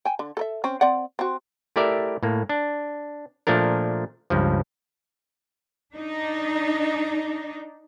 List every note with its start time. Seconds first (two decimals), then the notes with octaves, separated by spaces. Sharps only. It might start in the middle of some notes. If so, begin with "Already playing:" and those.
0.05 G5 G#5
0.19 D3
0.37 A4 A#4 E5
0.64 C4 C#4
0.81 C4 D5 F#5
1.19 C4 F#4
1.76 A3 E4 G4 A#4 D5 E5
2.23 A2 A#3
2.49 D4
3.47 A#2 F3 A3 D4 A#4
4.30 C#2 G2 F3
5.95 D4 D#4